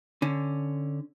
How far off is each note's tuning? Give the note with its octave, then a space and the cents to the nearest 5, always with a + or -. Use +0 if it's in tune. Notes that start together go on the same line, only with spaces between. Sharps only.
D3 +0 C#4 +0